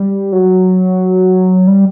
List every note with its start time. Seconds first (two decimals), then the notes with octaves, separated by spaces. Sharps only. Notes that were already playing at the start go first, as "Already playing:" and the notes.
Already playing: G3
0.32 F#3
1.67 G3